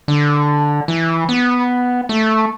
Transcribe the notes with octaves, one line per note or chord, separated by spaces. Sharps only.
D3
E3
B3
A3